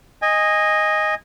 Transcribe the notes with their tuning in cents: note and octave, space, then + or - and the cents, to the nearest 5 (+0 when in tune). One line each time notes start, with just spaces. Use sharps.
D#5 +0 G#5 -20